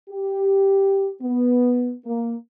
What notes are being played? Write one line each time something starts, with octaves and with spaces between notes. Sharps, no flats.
G4
B3
A#3